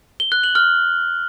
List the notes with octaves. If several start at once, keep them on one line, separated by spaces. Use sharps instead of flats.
G7
F#6
F#7
F6